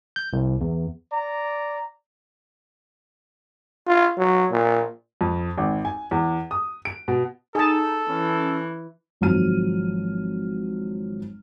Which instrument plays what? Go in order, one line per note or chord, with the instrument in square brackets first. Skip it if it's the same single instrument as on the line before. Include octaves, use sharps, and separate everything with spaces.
[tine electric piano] G6
C2
E2
[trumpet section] D5 A#5
[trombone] F4
F#3
A#2
[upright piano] F2
G#1
G#5
E2
D#6
D7
B2
[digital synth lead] D#4 [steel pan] G#4 A5 [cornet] A4
[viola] E3 [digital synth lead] C#4
[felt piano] G#1 F3 F#3 F6 D#7